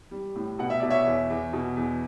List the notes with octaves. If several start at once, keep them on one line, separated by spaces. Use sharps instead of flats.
G3
A2
B2 F#5
E5
B2 D5
C#5 E5
E2
E2
B2
E2